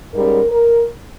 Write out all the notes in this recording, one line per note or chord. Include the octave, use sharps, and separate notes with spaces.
G#2 G3 C#4 A#4
A#4